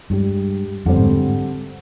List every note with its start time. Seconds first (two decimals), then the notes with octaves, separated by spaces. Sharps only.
0.10 G2 G#3 D4 G4
0.86 F2 D3 G3 C4
0.98 G#2